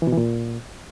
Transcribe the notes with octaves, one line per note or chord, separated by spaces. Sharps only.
E3
B2
E3
A#2